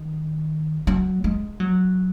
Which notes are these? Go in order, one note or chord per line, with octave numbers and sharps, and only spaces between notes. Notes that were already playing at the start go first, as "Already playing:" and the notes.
Already playing: D#3
F#3
G#3
F#3